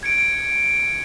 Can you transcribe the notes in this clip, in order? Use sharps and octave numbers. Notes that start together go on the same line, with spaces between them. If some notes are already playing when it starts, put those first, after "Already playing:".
G#6 C#7 D7